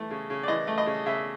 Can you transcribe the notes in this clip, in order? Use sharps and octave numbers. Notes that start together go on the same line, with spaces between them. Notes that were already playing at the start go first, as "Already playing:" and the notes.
Already playing: E3 A3
C#3
C#3
D5
E3 D#5
A3
D#5
C#3
C#3 E5